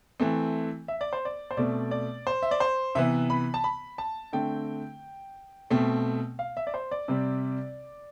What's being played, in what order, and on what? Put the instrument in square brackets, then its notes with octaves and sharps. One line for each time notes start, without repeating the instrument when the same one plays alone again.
[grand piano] E3 A3 C4
E5
D5
C5
D5
C5
B2 A3 C4 D5
D5
C5
E5
D5
C5
C3 E3 B3 E5
B5
A5
B5
A5
D3 A3 C4 G5
B2 A3 C4
F5
E5
D5
C5
D5
C3 G3 C4